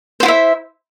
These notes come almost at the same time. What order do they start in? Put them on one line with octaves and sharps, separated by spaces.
C5 F4 E4 E5